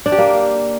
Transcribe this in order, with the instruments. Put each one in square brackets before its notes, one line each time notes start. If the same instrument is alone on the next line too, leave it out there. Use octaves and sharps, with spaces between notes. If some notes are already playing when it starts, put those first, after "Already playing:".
[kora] D4
G4
A#3